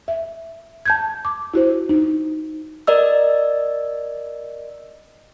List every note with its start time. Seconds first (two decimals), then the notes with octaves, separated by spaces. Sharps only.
0.08 E5
0.86 A5 G6 G#6
1.25 D6
1.54 E4 F#4 C5
1.89 D#4
2.87 A#4 D5 D#5 E6